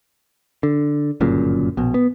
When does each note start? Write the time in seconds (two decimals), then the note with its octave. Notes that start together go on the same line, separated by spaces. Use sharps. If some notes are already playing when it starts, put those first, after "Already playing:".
0.63 D3
1.21 G1 F#2 A#2 C#3
1.77 A#1 B2
1.94 B3